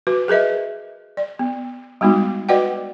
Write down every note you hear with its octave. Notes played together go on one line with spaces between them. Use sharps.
F#4 B4
G#4 A#4 B4 D#5 E5
D5
B3
G3 G#3 B3 D#4 F#4
F#4 B4 D5 D#5 F#5 G5